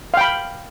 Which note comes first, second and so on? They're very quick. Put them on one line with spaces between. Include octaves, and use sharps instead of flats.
F5 G5 B5